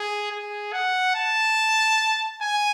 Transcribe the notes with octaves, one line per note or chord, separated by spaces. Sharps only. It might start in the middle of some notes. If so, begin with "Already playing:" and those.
Already playing: G#4
G#4
F#5
A5
G#5